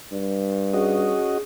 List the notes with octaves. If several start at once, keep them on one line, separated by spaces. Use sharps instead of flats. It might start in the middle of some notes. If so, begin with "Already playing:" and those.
G2
C#4 F#4 G#4 D#5